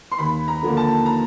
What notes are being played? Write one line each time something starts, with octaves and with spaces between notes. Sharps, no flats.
C6
D#2 B5
A#5
D3 F3 A#3
A5
A#5